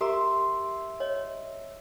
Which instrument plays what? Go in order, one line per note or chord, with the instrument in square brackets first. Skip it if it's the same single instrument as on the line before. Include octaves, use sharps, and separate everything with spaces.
[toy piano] G4 A#4 A#5 [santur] E5 C6 D6
[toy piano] C#5 D#5